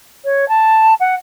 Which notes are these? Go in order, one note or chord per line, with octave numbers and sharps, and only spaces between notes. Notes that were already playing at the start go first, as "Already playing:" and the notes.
C#5
A5
F#5